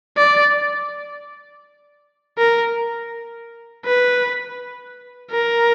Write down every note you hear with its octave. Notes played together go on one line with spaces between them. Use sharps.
D5
A#4
B4
A#4